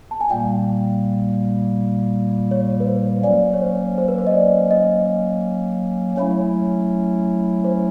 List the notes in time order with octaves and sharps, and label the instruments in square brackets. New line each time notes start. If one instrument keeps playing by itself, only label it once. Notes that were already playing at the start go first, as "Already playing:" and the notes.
[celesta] A5
G#5
[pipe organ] A#2 G3 A#3 [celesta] G5
[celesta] C#5
B4
C5
[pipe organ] F#3 A#3 C#4 [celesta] D5
[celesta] C#5
C5
C5
B4
C5
D#5
D5
D#5
[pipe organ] F#3 A3 C#4 E4 [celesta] C#5
[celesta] C5